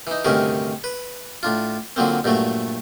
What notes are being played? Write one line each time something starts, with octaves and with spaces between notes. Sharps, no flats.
E3 D#4
D2 G2 C3 D#3 C#4 A#4
B4
A2 D4 F4
D3 F3 F#3 A#3 C4
G2 A#2 F#3 A3